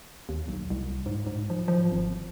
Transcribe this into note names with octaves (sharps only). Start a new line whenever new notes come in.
D#2
B1
C2
G#2
G#2
F3
F3
G#1